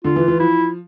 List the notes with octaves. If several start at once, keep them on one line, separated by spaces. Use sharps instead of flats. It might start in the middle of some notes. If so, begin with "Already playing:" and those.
D3 F4
E3
E3
F3 E4